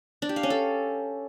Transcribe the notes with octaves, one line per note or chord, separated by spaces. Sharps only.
D4
G4
F5
C#4
A4